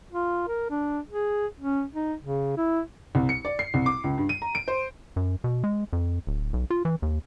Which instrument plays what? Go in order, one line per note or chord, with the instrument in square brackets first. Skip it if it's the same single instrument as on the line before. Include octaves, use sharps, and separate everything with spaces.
[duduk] F4
A#4
D4
G#4
C#4
D#4
C#3
E4
[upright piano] C2
C#7
D5
C7
C2
D6
C#2
G2
D#7
A#5
D7
C5
[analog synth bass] F#2
B2
G#3
F2
D1
B1
F4
E3
D#2